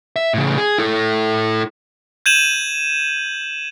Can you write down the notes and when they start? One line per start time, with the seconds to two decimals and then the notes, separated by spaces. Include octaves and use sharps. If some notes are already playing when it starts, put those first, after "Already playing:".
0.16 E5
0.34 A2 C#3
0.58 G#4
0.78 E4 A4
2.26 G6 G#6 D#7 E7 F#7